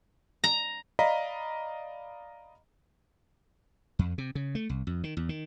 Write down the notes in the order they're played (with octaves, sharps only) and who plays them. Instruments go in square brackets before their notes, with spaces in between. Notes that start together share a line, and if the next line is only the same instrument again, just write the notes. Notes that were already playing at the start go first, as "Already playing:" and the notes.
[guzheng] A#5
[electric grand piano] D5 D#5 F5 A#5 B5 B6
[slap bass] F2
C3
C#3
A3
C2
F2
D#3
E2
D#3